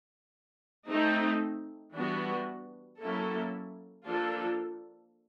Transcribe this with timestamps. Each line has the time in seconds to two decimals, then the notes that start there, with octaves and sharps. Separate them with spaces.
0.88 A3 C4 D#4
1.94 E3 G3 B3 D4 F#4
3.00 F#3 A#3 C#4 E4 A4
4.06 F3 A#3 D4 F4 A4